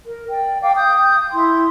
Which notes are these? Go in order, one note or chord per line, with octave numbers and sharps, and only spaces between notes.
A#4
D5 G5
F5 G5 D6
D#6 G6
E4 C6